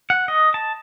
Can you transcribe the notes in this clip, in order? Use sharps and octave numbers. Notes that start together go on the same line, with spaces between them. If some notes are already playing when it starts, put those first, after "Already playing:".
F#5
D#5
A5